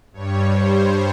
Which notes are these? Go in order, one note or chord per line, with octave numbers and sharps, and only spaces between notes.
G2 G3 C#5
C5